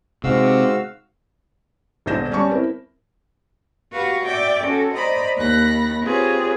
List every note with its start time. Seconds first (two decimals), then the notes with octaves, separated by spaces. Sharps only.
0.24 G#2 C3 F#4 F5 E6
2.06 E1 A#1 D3 G6 A#6 E7
2.31 G3 C#4 C#5 A5 C#6
2.50 C4 E4 A#4
3.93 F#4 G4 B4 F5 C#6
4.25 D5 E5 G5 D6
4.62 C#4 F#4 A4
4.94 C5 D5 D#5 A#5 B5
5.37 D#2 B5 F#6 A#6
6.03 C4 F4 G4 G#4 B4 C#5